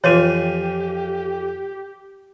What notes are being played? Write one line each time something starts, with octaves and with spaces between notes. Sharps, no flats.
F2 E3 F3 F4 G4 C#5 F5 G#5